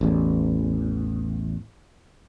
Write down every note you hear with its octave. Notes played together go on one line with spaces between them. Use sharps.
A1 E2